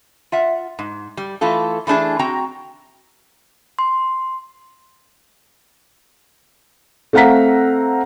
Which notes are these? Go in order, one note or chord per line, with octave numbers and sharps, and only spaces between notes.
F4 E5 F#5
G#2
G3
E3 A3 F4 A4
E3 A3 D4 G#4
C4 F#4 G5 A#5
C6
A3 C4 F5 F#5 A#5 B6